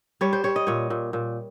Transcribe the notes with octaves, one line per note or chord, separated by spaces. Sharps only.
G3 C#5
C5
G3 C#5
D#5
A#2 C#5
A#2
A#2